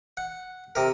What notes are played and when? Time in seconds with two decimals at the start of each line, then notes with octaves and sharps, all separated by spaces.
0.17 F#5
0.75 C3 A#4